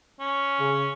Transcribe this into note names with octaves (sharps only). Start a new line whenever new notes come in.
C#4
C#3